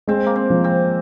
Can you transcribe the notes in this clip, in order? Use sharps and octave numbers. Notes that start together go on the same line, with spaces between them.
G#3 C4
A#3
C4
F3
C4